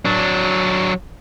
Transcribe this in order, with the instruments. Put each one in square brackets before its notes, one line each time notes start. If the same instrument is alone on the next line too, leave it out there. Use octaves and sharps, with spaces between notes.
[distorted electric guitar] F#3 D4